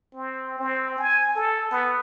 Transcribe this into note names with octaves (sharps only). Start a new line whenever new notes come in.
C4
C4
G#5
A4
B3